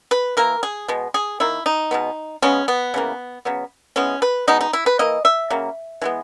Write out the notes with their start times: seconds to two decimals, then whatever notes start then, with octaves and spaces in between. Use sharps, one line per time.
0.11 B4
0.37 E3 A#3 A#4
0.63 G#4
0.88 B2 G#3 B3
1.14 G#4
1.40 D#3 A#3 E4
1.66 D#4
1.91 B2 G#3 B3
2.42 C#3 G#3 B3 C#4
2.68 B3
2.94 C#3 E3 A#3
3.45 C#3 F#3 B3
3.96 E3 G#3 B3 C#4
4.22 B4
4.47 B2 G#3 B3 D#4
4.61 D#4
4.73 E4
4.86 B4
4.99 E3 A#3 D#5
5.25 E5
5.50 C#3 F#3 A#3
6.02 E3 G#3 B3